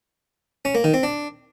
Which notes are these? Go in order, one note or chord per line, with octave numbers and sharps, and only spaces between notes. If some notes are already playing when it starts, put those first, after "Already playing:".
C#4
A#3
D#3
C4
D4